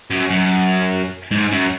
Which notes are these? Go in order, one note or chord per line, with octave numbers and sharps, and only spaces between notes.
F#2
F#2
G#2
F#2